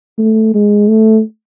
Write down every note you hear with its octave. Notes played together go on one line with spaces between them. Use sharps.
A3
G#3
A3